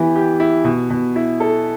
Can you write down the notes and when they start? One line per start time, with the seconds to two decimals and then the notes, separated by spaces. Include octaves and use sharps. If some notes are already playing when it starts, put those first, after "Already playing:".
Already playing: E3 B3 E4 G4
0.16 G4
0.40 E4
0.65 B2
0.90 B2
1.16 E4
1.40 A4